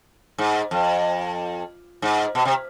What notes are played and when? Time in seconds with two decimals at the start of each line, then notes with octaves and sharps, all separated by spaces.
0.38 G#2
0.71 F2
2.02 G#2
2.35 B2
2.45 C3